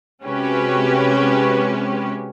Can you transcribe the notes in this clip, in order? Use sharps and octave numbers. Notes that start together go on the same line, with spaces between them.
C3 G#3 C#4 F#4 G4 B4